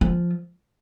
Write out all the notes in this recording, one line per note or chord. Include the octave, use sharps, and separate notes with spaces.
F3